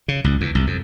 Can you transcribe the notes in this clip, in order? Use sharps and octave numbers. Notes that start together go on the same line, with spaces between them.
C#3
C#2
E2
C2
F2